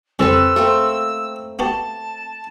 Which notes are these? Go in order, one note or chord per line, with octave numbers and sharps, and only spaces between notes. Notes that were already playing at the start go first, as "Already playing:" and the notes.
C2 F2 C3 C4 A4 B4 E6
A3 A#3 C4
B3 F#4 G4 A5